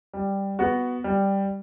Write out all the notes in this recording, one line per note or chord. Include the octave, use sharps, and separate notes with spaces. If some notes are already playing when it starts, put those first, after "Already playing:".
G3
B3 F#4
G3